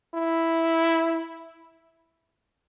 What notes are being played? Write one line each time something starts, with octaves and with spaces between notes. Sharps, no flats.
E4